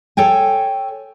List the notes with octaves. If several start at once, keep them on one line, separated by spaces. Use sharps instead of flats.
A4 C#5 G5 G#5